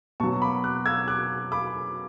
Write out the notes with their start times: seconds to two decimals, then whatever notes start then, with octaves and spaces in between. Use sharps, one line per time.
0.20 B2 A5 C#6
0.23 F#3
0.42 B5 D6
0.64 D6 F#6
0.86 E6 G#6
1.08 D6 F#6
1.52 B5 D6